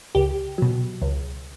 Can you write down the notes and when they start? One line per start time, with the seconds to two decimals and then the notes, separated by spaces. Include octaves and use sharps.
0.15 C#2 G4
0.58 B2 F#3
1.02 C#2